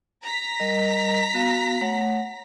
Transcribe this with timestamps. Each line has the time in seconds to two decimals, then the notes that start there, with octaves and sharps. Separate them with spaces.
0.24 A#5 A#6 B6
0.60 G3 A#4 D#5
1.34 B3 F#4 F5
1.81 A3 C#5 F#5